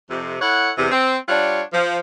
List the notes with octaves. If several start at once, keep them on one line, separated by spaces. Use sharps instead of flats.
F2 C3
E4 A4 C#5 F#5
E2 C3
C4
G3 D4 F4 C#5 F#5
F3